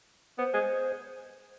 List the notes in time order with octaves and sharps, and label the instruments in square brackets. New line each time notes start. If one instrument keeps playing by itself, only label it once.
[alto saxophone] B3 [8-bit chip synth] C5
[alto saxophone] G#3